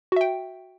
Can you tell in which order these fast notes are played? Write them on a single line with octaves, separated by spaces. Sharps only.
F#4 E5 G5